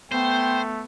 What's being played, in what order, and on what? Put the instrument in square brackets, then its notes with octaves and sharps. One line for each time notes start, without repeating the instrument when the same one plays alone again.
[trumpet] A3 [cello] B3 [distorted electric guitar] C5 [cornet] G5